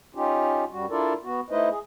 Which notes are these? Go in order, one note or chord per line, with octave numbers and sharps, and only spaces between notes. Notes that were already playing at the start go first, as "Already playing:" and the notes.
C#4 D#4 F4 G4
F#2 G3 F#4
D4 E4 F4 A4 A#4 D5
B3 F#4
A3 D#4 E4 B4 C5 D#5
G#4